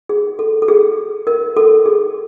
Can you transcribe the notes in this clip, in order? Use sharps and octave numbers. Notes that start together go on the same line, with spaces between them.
G#4
A4
A4
G#4
A#4
A4
G#4